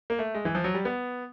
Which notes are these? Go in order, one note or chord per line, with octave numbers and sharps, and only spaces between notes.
A#3
A3
G#3
E3
F3
F#3
G3
B3